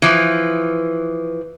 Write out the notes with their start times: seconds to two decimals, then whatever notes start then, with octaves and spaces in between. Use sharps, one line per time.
0.02 E3 F3